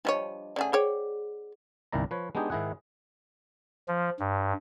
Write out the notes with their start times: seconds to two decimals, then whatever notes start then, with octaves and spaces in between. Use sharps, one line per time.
0.05 F3 G3 D4 C#5 D#5 A5
0.56 C#3 A3 G#4 D5 F#5
0.73 G#4 C5 C#5 G5
1.92 G1 C2 D#3 E4 D5 A#5
2.11 F3 B4 C#5
2.35 G#3 B3 D4 D#4 G4 G#4
2.50 G#2 D#3 E4 G#4 F#5
3.88 F3
4.19 G2